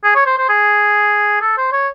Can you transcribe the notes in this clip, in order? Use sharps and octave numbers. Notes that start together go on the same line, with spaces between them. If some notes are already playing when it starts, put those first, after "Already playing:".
G#4
C#5
C5
C5
G#4
A4
C5
C#5